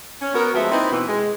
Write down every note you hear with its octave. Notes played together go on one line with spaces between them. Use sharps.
C#4
B3 F#4 A#4
F3 G#3 A3 B3 C4 E5
A#3 C4 D#4 E4 B4
B2 E3
G#3